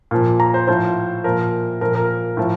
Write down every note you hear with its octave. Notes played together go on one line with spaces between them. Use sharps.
A#2 F3
A#5
C5
A2 F3 C5
A#2 F3 A#4
A#2 F3 A#4
A#4
A2 F3